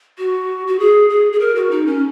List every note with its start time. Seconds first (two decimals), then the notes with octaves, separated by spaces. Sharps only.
0.18 F#4
0.67 F#4
0.79 G#4
1.10 G#4
1.33 G#4
1.40 A#4
1.56 F#4
1.71 D#4
1.86 C#4